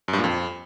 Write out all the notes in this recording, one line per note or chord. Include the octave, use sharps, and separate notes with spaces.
F#2
G2
A#2
F2